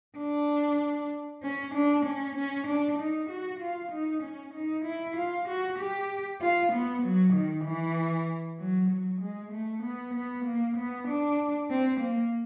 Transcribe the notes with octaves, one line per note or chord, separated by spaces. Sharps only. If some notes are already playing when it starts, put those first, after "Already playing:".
D4
C#4
D4
C#4
C#4
D4
D#4
F#4
F4
D#4
C#4
D#4
E4
F4
F#4
G4
F4
B3
F#3
D#3
E3
F#3
F#3
G#3
A3
B3
B3
A#3
B3
D4
C4
A#3